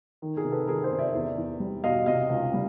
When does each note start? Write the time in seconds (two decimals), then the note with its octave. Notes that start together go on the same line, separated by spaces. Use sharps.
0.22 D#3
0.36 G#4 A#4
0.44 C3
0.52 A4 B4
0.68 D#3 G#4 A#4
0.83 A#4 C5
0.91 C3
0.98 D5 E5
1.14 E2
1.38 E2
1.60 G3
1.84 B2 D#5 F5
2.06 C3 D#5 F5
2.29 C#2
2.54 G3